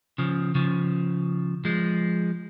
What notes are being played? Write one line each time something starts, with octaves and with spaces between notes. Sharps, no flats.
C#3 F3
C#3 F3
F3 G#3